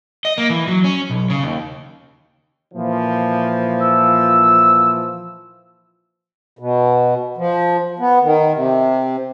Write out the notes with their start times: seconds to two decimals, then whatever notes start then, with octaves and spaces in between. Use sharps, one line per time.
0.25 D#5
0.38 A#3
0.50 E3
0.68 F#3
0.84 C#4
1.10 B1
1.30 C#3
1.43 D#2
2.74 A#2 E3 F3
3.81 E6
6.59 B2
7.37 F3
7.99 B3
8.22 D#3
8.54 C3